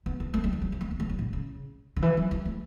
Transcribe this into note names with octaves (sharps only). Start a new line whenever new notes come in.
B3
B3
A3
G3
E3
F#3
G3
A3
B3
A3
G3
A2
C#3
D3
E3
F#3
G3
A3